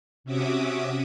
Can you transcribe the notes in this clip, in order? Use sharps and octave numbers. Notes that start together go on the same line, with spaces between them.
C3 C#4 F#4 E5 D6 D#6